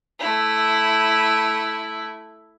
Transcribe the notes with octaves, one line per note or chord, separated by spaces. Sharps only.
A3 E4